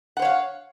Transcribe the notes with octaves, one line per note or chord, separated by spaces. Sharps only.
C5 C#5 F5 F#5